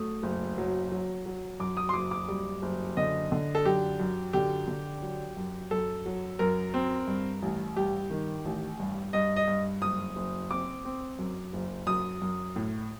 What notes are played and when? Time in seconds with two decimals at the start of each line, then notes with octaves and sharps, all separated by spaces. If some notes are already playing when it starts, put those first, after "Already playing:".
Already playing: F#3 A3 D#6
0.23 F#1
0.58 F#3
0.91 F#3
1.26 F#3
1.60 F#2 D6
1.77 D#6
1.89 C6
1.94 F#1 D6
2.11 D6
2.28 G3
2.62 F#1
2.97 D3 D#5
3.32 D3
3.55 A4
3.65 F#2 G4
4.00 F#2
4.33 D3 G4
4.68 D3
5.02 F#3
5.37 F#2
5.71 F#2 A4
6.06 F#3
6.39 F#2 A#4
6.74 C4
7.07 G2
7.42 A1
7.77 G2 G4
8.10 D#3
8.45 A1
8.80 G2
9.13 G2 D#5
9.36 D#5
9.48 G2
9.82 F#1 D#6
10.16 F#1
10.51 C4 D6
10.85 C4
11.19 F#2
11.53 F#1
11.87 F#2 D#6
12.22 F#2
12.56 A2